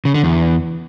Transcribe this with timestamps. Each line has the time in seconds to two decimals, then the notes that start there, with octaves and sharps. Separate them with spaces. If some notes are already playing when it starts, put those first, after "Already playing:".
0.05 C#3
0.14 D3
0.24 E2